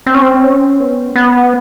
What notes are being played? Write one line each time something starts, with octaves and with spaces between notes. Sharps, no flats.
C4
C#4
C4
C#4
B3
B3